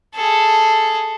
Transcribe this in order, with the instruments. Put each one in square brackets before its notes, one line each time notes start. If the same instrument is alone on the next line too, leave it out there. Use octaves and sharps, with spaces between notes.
[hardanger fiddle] G#4 A4